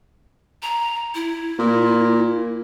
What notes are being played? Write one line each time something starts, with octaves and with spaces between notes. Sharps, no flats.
A#5
E4
A#2